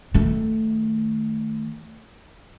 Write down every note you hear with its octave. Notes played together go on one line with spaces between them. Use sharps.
D#3 A3